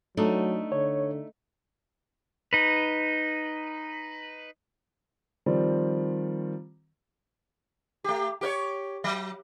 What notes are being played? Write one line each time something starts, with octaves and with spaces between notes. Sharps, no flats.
F#3 A3 D4 D#4
D3 C#5
D#4 B4
D#3 F3 G3 C4
A3 G4
G4 A#4 C#5
F#3